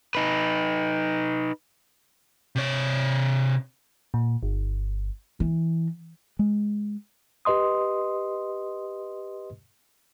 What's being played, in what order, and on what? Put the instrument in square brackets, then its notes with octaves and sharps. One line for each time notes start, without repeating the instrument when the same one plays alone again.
[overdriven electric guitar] D#4 B4
[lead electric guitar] C3 C#5
[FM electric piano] A#2
G1
[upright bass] E3
[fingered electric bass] G#3
[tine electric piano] G4 B4 D#5 C6 D#6